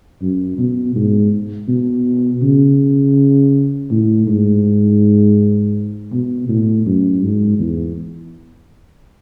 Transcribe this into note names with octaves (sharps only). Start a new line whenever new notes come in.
F#2
B2
G#2
B2
C#3
A2
G#2
B2
A2
F#2
G#2
E2